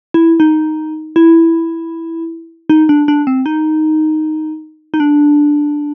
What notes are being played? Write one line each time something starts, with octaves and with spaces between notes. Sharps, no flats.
E4
D#4
E4
D#4
D4
D4
C4
D#4
D#4
D4